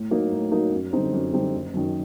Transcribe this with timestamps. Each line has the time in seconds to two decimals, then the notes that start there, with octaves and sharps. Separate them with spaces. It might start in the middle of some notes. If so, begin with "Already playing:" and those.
Already playing: A2
0.11 F#3 A#3 D#4
0.32 A2
0.52 F#3 A#3 D#4
0.72 F#2
0.93 D3 G3 C4 D#4
1.13 F#2
1.33 D3 G3 C4 D#4
1.54 F#1
1.74 F#2 D#3